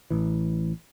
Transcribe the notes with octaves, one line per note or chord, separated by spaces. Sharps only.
A1 E3